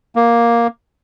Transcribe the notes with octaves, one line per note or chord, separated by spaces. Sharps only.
A#3